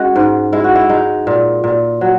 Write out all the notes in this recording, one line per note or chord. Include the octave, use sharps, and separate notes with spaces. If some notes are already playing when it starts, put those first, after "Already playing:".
Already playing: G#3 C#4 F#4 G#4
G#2
G#3 E4
F#4
E4
G#3 D#4
A#2
A#2
F#3